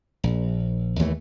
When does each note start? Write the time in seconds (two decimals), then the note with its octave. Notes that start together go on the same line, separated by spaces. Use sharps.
0.24 A#1
0.99 D#2 E3 A3